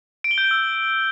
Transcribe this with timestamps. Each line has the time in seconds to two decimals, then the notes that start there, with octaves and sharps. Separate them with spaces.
0.24 D7
0.31 G7
0.38 G6
0.44 D7
0.51 E6